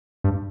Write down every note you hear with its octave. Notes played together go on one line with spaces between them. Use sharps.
G2